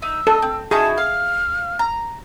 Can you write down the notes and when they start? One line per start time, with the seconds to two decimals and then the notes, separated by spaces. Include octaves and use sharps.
0.02 D#4 E6
0.27 A4 D#5
0.42 C4
0.71 D#4 E4 F#4 G#4 A5
0.98 F5 F6
1.79 A#5